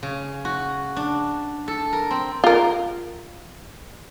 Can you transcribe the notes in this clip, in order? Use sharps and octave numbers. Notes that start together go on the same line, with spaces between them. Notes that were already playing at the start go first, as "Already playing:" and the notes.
C#3
F#4
D4
A4
A#4
C4
F4 A#4